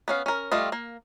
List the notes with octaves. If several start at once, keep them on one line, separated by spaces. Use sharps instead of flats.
B3 C#4 F5
C#4 A#4
G3 A3 F4 D#5
A#3